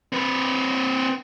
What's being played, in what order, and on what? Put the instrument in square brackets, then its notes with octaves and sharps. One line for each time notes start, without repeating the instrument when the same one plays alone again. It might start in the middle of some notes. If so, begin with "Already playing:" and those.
[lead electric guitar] C4 B4